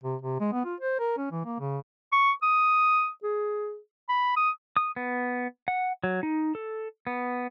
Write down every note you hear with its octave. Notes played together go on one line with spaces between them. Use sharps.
C3
C3
G#3
B3
F4
C5
A#4
C#4
E3
A#3
C#3
C#6
D#6
G#4
B5
D#6
D#6
B3
F#5
F#3
D#4
A4
B3